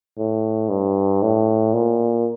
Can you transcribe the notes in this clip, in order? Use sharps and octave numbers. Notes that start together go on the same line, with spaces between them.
A2
G2
A2
A#2